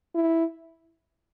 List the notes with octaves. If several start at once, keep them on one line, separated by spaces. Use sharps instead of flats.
E4